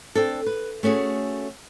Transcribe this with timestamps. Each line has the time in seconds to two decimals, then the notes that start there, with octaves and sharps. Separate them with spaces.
0.15 C4 D4 A4
0.46 B4
0.83 A3 C#4 F#4 G#4